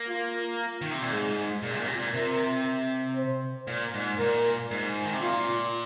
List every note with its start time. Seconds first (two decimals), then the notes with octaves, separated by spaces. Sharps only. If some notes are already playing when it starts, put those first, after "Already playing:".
Already playing: A#3
0.08 F4
0.81 D#3
0.91 C3
1.01 A#2
1.11 G#2 G#4
1.63 A#2
1.71 C3
1.78 A#2
1.86 C3
1.94 A#2
2.13 C3 A#4
3.16 C5
3.67 A#2
3.94 G#2
4.19 A#2 A#4
4.71 G#2
5.04 D#3
5.13 C3
5.21 A#2 F4